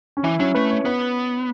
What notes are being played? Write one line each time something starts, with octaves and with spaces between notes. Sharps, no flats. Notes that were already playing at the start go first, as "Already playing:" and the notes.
C#4
E3 E4
F#3 C#4
A3 B4
C#5
B3 B4